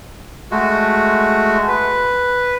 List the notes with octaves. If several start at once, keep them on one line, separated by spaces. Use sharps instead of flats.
G#3 A3 F#4
B4